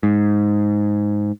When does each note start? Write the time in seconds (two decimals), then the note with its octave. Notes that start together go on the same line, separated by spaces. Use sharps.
0.03 G#2